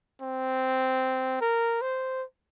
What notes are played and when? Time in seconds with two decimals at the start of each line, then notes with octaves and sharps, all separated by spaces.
0.22 C4
1.41 A#4
1.81 C5